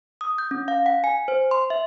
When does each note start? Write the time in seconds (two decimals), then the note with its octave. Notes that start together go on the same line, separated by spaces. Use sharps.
0.21 D#6
0.38 G6
0.51 C#4
0.68 F5
0.86 F#5
1.04 G#5
1.28 C5
1.51 C6
1.70 E5